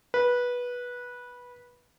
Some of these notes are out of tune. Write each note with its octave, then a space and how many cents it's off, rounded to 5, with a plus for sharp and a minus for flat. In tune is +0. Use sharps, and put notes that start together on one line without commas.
B4 -15